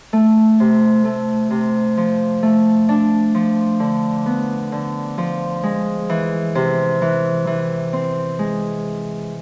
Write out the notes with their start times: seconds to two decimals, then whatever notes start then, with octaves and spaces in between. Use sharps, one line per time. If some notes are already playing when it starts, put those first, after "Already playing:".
0.13 A3
0.60 C3
1.05 A3
1.50 C3
1.97 F3
2.43 A3
2.89 D4
3.34 F3
3.80 D3
4.26 B3
4.72 D3
5.18 F3
5.63 G#3
6.09 E3
6.55 C3
7.02 E3
7.47 E3
7.93 C4
8.39 G#3